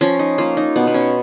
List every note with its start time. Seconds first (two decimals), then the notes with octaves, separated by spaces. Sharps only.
0.01 F3 C#4
0.19 D#4
0.38 A#3 F4
0.57 D#4
0.76 B2 B3
0.87 B3
0.94 C#4